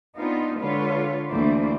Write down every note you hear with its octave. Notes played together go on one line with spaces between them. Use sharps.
B3 C4 D4 D#4 F4
D3 G#3 F4 B4 C#5
D2 E3 A3 A#3 C5 D5